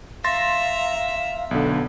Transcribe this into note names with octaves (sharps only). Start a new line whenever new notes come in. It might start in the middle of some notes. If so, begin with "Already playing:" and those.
E5 F5 A#5 C6 A6 A#6
B1 D3 B3